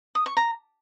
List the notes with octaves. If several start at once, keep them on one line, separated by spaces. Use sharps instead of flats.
D#6
C#6
A#5